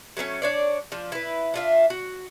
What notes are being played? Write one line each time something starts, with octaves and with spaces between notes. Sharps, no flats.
F#3 A3 B3 C#4
D4 C#5 D5
F3 D4
E4 B4
D4 F4 E5
F#4